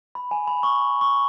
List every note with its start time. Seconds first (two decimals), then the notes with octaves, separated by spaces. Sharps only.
0.15 B5
0.31 G#5
0.47 B5
0.63 C#6
1.01 C#6